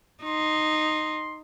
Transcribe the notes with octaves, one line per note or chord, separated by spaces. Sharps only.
D#4 C6